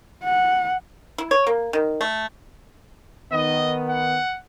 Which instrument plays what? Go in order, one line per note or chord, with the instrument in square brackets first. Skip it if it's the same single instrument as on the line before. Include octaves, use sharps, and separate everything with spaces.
[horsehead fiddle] F#5
[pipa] E4
C#5
A#3
D#3
A3
[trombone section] D#3 B3 [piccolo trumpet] D#5
[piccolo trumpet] F#5